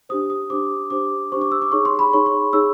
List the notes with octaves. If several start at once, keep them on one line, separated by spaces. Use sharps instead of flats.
D4 G4 C5 D#6
D#6
D4 G4 C5 D6
D4 G4 C5 D6
D4 G4 C5 C#6
D6
E6
D6
D#4 G#4 C#5 C#6
C6
B5
D#4 G#4 C#5 C#6
C#6
D#4 G#4 C#5 E6